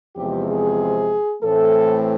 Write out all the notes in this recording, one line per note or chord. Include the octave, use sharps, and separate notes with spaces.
E2 C3 F3 G#3 C4 G4
G#4
A2 E3 A3 C4 A4